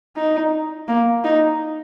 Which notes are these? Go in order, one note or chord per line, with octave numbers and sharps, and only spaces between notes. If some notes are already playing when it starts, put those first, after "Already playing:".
D#4
A#3
D#4